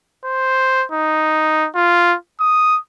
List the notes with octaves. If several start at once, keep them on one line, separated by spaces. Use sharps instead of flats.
C5
D#4
F4
D#6